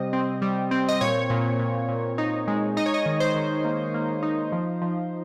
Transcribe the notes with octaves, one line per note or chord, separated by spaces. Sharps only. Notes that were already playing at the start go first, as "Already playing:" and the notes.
Already playing: C3 G3 C4 D#5
C4
G3
C4
D#5
A#2 C#5
A#2
A#2
A#2
D#4
G#3
D#4 D#5
C#5
D#5
D#3
C5
D#3
A#3
A#3
D#4
F3
F3